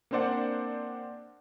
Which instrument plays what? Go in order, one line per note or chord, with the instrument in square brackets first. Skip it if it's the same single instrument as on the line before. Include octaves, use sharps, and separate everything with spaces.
[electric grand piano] A#3 C4 D4 C5 D5 F#5